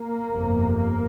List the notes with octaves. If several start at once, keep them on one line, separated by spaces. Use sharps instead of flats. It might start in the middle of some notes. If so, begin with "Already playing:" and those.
Already playing: A#3
G1 F2 C3
A#3